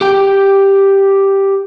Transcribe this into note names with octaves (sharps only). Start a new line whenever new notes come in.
G4 G5